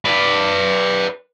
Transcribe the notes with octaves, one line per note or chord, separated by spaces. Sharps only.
B4 D5